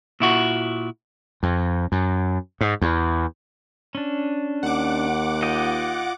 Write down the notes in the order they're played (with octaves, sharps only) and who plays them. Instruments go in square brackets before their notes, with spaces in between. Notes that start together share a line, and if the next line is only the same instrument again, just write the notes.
[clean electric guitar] A#2 E4 F#4
[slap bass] F2
F#2
G#2
E2
[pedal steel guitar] C#4 D4
[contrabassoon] D#2 [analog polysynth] F#5 D6
[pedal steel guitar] F4 D#5 G5